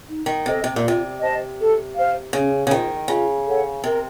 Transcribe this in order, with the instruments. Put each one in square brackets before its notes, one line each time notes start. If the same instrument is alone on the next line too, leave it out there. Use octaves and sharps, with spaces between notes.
[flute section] D#4
[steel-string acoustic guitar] D#3
[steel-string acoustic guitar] C3 [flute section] A4 C5 D#5
[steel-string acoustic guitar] C3
A#2
[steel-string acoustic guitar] C3 [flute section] F4
[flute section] C5 D#5 A5
A4
C5 F5
[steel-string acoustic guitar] C#3 [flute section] C#4
[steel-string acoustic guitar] C#3
[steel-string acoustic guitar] D#3 [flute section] F4 C5 D#5
[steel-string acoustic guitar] C#3 [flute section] F4
[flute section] A4 C#5 F#5
[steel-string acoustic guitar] C3 [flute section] A#4